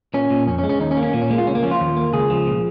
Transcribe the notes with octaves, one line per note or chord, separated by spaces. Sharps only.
A#2 C#4
A#2
F2 C#4
C#4
G#3
C#4
D#2 D#4
C#4
A#3
C#4
A#2 A#3
C#4
G#3 A#3
F4
C#2 C#4
A#3
F3 C#4
F4
D#2
A#3
C#2 G#4
F3
A#2